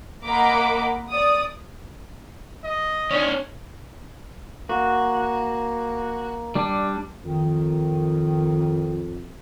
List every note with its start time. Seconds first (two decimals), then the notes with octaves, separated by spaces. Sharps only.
0.24 A#3 D#5 F#5 A#5 B5 D6
1.11 D5 D#6
2.64 D#5
3.11 C#4 D4
4.69 A#3 F#4
6.55 G3 D4
7.25 F2 D#3